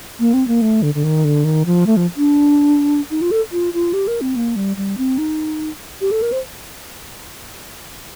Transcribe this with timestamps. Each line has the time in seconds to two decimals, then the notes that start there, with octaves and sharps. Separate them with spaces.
0.20 A#3
0.34 C4
0.48 A#3
0.62 A3
0.83 D3
0.95 D3
1.04 D#3
1.24 D3
1.45 D#3
1.66 F3
1.87 A3
1.97 F3
2.17 D4
3.11 D#4
3.21 F4
3.31 A4
3.52 F4
3.74 F4
3.93 G4
4.08 A#4
4.21 C4
4.36 A#3
4.56 G3
4.77 G3
4.98 C4
5.18 D#4
6.01 G4
6.11 A4
6.22 A#4
6.32 C5